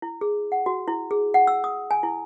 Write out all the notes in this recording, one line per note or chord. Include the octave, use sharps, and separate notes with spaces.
E4
G#4
F#5
F#4
E4
G#4
F#5
E6
D#6
G#5
E4